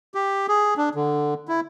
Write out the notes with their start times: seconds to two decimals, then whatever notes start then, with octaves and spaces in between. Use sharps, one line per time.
0.15 G4
0.48 G#4
0.77 D4
0.95 D3
1.48 E4